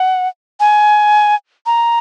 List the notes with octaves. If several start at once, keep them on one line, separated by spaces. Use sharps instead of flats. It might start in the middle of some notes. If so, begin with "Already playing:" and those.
Already playing: F#5
G#5
A#5